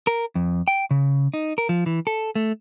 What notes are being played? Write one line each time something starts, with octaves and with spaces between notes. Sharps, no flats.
A#4
F2
G5
C#3
D#4
A#4
F3
E3
A4
A3